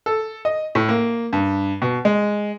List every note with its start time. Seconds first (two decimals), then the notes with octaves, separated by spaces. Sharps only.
0.06 A4
0.45 D#5
0.75 A2
0.89 A#3
1.33 G2
1.82 B2
2.05 G#3